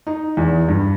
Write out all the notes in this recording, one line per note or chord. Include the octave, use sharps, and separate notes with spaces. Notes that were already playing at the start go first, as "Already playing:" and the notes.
D#4
E2
G2